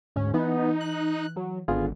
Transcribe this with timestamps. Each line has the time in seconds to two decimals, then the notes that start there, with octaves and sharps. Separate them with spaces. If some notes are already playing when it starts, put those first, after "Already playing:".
0.16 D2 G#2 C#4
0.34 E3 B3 D#4
0.80 F#6
1.36 F#3
1.68 G#1 D3 B3 F4 G#4